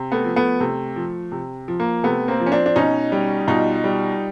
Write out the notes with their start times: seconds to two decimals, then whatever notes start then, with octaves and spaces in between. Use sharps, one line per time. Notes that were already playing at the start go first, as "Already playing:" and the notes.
Already playing: C3
0.12 A3 B3
0.24 F3
0.36 A3 B3
0.60 C3 A3
0.96 F3
1.32 C3
1.68 F3
1.80 A#3
2.03 C3 A3 B3
2.28 A#3 C4
2.40 F3
2.46 C#4
2.52 C4 D4
2.66 D4
2.76 B2 C#4 D#4
3.12 G3
3.48 B2 D#4 F4
3.84 G3